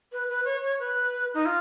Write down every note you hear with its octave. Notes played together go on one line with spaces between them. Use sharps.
B4
B4
C#5
C#5
B4
D#4
F4